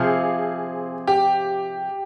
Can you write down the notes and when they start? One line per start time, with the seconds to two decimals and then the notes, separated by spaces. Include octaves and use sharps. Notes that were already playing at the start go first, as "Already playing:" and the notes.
Already playing: C3 F3 C4 F4 G#4
1.07 G4